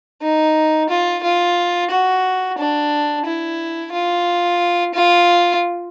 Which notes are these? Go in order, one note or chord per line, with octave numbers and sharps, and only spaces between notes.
D#4
F4
F4
F#4
D4
E4
F4
F4